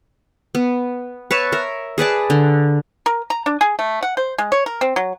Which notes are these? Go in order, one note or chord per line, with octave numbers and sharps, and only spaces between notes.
B3
B4 C#5 E5 A5
A#4 E5
G#4 B4 D5 A5
D3
A#4
A#5
D4
G#4
A3
F#5
C5
G#3
C#5
A#4
C4
F#3